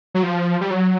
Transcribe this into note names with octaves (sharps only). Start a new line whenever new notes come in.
F#3
F3
G3
F#3